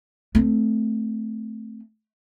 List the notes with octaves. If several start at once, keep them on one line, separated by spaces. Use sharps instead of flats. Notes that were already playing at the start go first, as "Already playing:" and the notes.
A3 C4